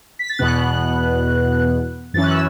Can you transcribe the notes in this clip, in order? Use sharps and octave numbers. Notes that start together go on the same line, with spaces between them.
B6
A6
E2 B2 B3 F#6
F#2 E3 C#4 A6
F#6
E6